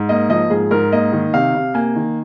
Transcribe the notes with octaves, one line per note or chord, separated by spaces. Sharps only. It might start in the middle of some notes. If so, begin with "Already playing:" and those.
Already playing: G#2
A#3 D#5
F3 D#5
G#2 G#4
G#2 A#4
A#3 D#5
D#3
C3 F5
C3
A#3 G#5
D#3